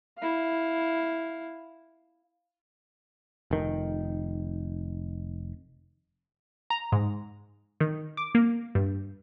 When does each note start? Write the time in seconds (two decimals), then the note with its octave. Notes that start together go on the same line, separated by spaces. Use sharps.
0.18 E4 F5
3.51 F1 D#3
6.70 A#5
6.92 G#2
7.80 D#3
8.17 D6
8.35 A#3
8.75 G2